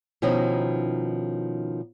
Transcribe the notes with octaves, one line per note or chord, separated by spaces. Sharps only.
B2 D#3 F3 C#4 D#4 E4